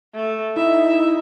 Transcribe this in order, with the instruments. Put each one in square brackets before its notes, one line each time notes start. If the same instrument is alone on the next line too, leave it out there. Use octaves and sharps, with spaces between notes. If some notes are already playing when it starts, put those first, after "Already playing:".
[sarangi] A3
[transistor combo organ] D#4 E4 [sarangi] E5